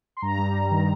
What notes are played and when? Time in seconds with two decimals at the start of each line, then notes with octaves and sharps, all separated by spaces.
0.17 C6
0.22 G2 A#5
0.38 G3
0.54 G2
0.71 D#3